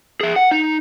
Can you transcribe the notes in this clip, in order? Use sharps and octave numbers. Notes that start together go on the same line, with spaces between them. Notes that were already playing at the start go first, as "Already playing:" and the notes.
G#4 E5
F#5
D#4